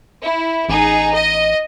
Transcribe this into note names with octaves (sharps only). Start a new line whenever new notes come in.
E4
A1 D#4 G#4
D#5